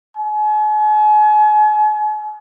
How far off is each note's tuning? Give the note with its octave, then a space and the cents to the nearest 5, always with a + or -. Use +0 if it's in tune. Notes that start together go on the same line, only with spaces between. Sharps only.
G#5 +40